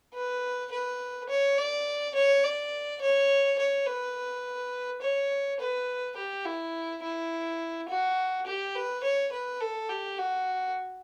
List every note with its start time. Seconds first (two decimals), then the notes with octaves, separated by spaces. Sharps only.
0.14 B4
0.71 B4
1.29 C#5
1.58 D5
2.15 C#5
2.44 D5
3.02 C#5
3.59 C#5
3.87 B4
5.02 C#5
5.60 B4
6.17 G4
6.45 E4
7.03 E4
7.89 F#4
8.47 G4
8.75 B4
9.04 C#5
9.32 B4
9.61 A4
9.89 G4
10.18 F#4